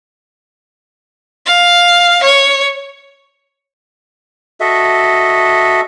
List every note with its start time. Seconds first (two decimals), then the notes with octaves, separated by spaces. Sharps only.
1.46 F5
2.23 C#5
4.60 F#4 A4 D#5 E5